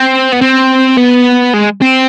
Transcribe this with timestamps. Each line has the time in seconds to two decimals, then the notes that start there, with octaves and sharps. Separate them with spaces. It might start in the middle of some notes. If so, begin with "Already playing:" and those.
Already playing: C4
0.33 B3
0.42 C4
0.97 B3
1.53 G#3
1.81 C4